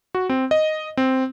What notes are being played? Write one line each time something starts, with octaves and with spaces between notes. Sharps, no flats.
F#4
C4
D#5
C4